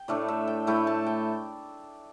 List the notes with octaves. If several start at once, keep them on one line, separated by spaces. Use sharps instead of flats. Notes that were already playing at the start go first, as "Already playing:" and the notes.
Already playing: G5
A2 A3 D4 D5
E5
G5
A2 A3 E4 G5
A5
G5